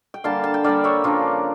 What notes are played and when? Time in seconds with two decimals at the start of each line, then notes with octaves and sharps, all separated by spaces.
0.14 G5
0.24 D3 G3 A#3 F5 A5
0.44 A5
0.54 G5
0.64 D3 G3 A#3 D5 F5
0.84 C#5 E5
1.04 C#3 F3 A#3 D4 F4